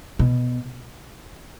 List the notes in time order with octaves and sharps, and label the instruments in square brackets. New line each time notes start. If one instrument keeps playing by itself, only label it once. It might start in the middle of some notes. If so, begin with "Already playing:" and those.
[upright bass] B2